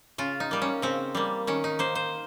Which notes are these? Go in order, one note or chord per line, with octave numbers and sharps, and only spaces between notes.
C#3 F4
D#4
G3 A#3
C#4
C#3 C4
G3 A#3
D#3 C#4
D#4
A#3 C5
C5